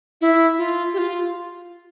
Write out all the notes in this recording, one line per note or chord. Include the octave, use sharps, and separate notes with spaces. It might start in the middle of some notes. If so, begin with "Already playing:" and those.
E4
F4
G4
F4